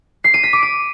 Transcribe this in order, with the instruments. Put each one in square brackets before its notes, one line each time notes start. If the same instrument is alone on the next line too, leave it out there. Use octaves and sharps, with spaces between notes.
[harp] C7
D#7
B6
D6
D#7